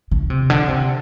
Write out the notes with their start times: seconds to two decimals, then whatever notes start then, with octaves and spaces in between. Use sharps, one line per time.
0.11 D3
0.30 C3
0.50 D3
0.69 C3